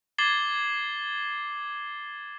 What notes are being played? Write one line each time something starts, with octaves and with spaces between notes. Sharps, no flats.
D6 G#6 A6 C7 F#7 G7